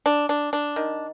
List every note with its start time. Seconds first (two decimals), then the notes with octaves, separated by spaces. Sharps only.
0.06 D4
0.29 D4
0.53 D4
0.76 D#3